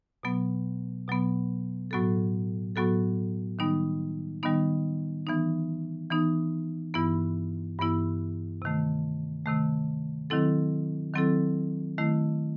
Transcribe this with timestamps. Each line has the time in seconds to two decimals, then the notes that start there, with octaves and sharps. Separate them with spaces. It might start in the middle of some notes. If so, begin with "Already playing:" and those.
0.23 B2 F#3 B3
1.08 B2 F#3 B3
1.91 A2 F#3 B3 F#4 A4
2.76 A2 F#3 B3 F#4 A4
3.59 D#3 G3 B3 D#4
4.43 D#3 G3 B3 D#4
5.27 E3 B3 D#4
6.10 E3 B3 D#4
6.94 G2 E3 B3 E4
7.79 G2 E3 B3 E4
8.62 C3 D#3 A3
9.46 C3 D#3 A3
10.30 D#3 F#3 C4 E4 A4
11.14 D#3 F#3 C4 E4 A4
11.98 D#3 A3 E4